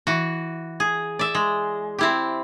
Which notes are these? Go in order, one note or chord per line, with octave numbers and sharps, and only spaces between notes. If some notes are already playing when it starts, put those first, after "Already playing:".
E3 F#4
G#4
D5 E5
G#3
C4 E4 G4